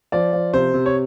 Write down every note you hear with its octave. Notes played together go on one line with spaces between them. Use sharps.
F3 D5
F3
C3 C5
C3
C#5